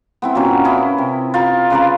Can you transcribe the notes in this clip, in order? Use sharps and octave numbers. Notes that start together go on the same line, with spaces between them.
B3 C4 E4
A#2 F#3 C4 C#4
C#4 E4 B4 D#5
C3
F4 G5 A#5
C#3 B4 D5 A#5